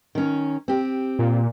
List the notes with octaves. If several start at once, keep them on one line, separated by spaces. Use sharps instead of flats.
D#3 C#4
C4 G4
A#2